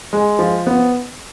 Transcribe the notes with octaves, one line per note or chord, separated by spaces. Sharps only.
G#3
F3
B3